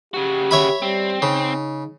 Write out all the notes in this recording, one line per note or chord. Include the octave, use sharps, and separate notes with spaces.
C#3 F#4 G4
C#5 E5 B5
G3 C4
C#3 D#4